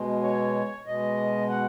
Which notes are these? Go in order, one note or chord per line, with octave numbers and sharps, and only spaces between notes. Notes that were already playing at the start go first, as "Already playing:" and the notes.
Already playing: B2 G#3
C#5
B2 G#3 D#5
F#5